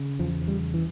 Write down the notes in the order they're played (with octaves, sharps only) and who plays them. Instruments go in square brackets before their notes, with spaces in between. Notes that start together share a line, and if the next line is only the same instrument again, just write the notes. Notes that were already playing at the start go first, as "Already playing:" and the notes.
Already playing: [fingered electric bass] C#3
E2 F3
C#3 G3
E3